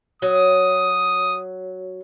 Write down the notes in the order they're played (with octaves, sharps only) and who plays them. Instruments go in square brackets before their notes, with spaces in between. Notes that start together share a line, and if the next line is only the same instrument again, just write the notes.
[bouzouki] F#3 [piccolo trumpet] D#6